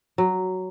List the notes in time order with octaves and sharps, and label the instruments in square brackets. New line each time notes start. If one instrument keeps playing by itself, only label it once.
[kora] F#3